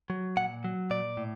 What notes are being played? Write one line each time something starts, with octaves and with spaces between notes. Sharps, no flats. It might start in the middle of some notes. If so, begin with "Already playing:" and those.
F#3
A#2 F#5
F#3
A#2 D5
A2